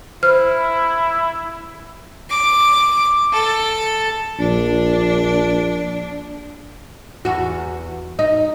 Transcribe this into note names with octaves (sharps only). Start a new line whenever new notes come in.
E4 C5 F6
D6
A4
A#1 D4
E2 F#4
D#4